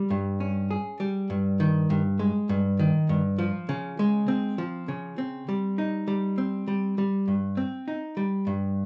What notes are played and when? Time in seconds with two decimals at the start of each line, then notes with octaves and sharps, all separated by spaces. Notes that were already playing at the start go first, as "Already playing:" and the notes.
Already playing: G3
0.10 G2
0.40 C#4
0.71 G#4
1.00 G3
1.30 G2
1.60 D#3
1.90 G2
2.19 G#3
2.49 G2
2.79 D#3
3.09 G2
3.38 F3
3.69 C#3
3.99 G#3
4.28 C4
4.58 F3
4.88 C#3
5.18 C4
5.48 G3
5.78 D#4
6.08 G3
6.38 C4
6.68 G3
6.98 G3
7.28 G2
7.57 C4
7.88 D#4
8.17 G3
8.47 G2